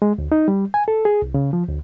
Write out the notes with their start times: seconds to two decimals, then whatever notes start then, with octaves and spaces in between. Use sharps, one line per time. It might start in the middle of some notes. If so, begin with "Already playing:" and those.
0.02 G#3
0.18 D2
0.32 D#4
0.48 G3
0.74 G#5
0.88 A4
1.05 G#4
1.22 C2
1.34 C#3
1.53 F3
1.68 D2